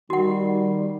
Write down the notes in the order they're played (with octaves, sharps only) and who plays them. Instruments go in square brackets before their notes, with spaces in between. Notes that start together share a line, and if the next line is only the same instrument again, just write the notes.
[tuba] D#3 [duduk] G3 [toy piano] F#4 F#5